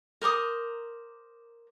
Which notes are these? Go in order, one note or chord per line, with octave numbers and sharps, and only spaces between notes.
A#4 C5 D6 D#6